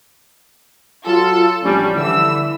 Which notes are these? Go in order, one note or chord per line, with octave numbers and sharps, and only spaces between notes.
F#3 F4 A4
A1 F3 G3 C#4 D4
D3 E3 E6